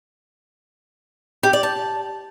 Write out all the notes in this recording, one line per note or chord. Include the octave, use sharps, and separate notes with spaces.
G4
D5
A5